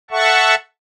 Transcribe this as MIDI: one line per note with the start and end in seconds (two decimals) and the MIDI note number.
0.11 0.55 69
0.11 0.55 76
0.11 0.55 78
0.11 0.55 81
0.11 0.55 85